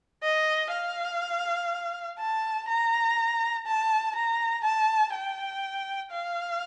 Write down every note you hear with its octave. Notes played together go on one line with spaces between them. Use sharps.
D#5
F5
A5
A#5
A5
A#5
A5
G5
F5